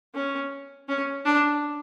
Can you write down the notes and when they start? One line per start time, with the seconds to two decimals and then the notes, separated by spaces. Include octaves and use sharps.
0.15 C#4
0.88 C#4
1.25 D4